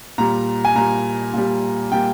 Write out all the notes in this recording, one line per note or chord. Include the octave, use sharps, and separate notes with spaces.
A#2 G3 A#5
G#5
A#2 G3 A#5
A#2 G3
A#2 G3 G5